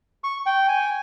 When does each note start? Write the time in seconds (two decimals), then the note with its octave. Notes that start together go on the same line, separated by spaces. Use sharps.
0.24 C#6
0.46 G5
0.68 G#5